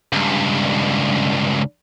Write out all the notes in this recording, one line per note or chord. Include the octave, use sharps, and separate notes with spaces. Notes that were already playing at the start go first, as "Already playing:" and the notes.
C#2 G2